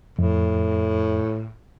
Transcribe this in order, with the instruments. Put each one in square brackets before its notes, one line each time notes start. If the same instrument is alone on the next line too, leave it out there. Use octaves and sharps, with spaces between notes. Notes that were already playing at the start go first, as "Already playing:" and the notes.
[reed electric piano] F2 [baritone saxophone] A2